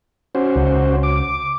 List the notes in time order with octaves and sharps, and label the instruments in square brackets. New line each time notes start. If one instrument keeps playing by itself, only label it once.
[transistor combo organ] C#4 F#4 C5
[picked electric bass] C#2
[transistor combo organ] D6